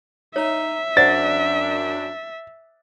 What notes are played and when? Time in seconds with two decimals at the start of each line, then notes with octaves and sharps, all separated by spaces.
0.36 D#4 C#5 E5
0.97 F#2 D4 C5 D5 F#5 A6